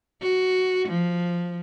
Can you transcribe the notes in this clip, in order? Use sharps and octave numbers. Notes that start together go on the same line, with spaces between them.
F#4
F3